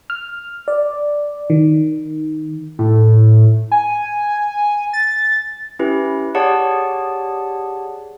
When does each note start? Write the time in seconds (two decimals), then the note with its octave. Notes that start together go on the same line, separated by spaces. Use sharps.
0.10 F6
0.68 D5
1.50 D#3
2.79 A2
3.72 G#5
4.93 A6
5.79 C#4 E4 G4 B4
6.35 G4 G#4 C#5 D5 F#5 A5